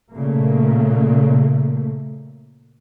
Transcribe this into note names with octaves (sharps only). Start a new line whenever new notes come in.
A#2 C#3 A3 A#3